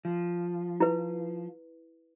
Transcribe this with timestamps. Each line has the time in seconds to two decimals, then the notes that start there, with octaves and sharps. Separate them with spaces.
0.05 F3
0.80 E4 B4